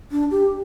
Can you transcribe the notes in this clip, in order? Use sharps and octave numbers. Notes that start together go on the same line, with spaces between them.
D4
G4